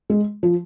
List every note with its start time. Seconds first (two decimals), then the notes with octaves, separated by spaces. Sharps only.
0.10 G#3
0.43 F3